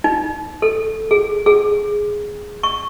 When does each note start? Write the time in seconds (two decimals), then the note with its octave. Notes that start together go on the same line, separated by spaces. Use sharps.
0.04 D#4
0.62 A4
1.11 G#4
1.46 G#4
2.63 C#6